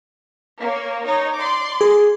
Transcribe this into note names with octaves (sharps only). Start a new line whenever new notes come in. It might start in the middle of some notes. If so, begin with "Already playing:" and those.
A#3 C#5
D#4 C#5
D5 C6 D6
G#4